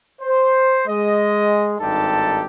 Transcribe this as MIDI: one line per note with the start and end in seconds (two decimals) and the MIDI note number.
0.21 0.82 72
0.87 1.75 56
0.87 1.75 75
1.80 2.46 32
1.80 2.46 43
1.80 2.46 63
1.80 2.46 67
1.80 2.46 69
1.80 2.46 81